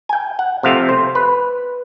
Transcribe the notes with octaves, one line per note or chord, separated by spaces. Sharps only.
G#5
G5
F#5
C3 F3 A3 C4 F5
C5
B4